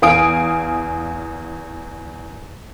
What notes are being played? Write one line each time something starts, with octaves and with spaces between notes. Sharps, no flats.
E2 F5 G#5 D#6 D7